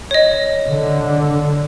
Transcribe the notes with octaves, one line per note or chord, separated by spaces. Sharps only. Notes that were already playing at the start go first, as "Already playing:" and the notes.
C#5 D#5
D3